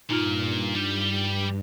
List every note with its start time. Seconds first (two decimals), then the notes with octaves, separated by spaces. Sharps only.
0.10 G2 A#2 D#4 F4 F6
0.75 G3 G4